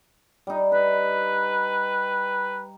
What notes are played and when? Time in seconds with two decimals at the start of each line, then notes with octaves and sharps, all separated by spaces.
0.47 G3 D#4
0.72 D#4 B4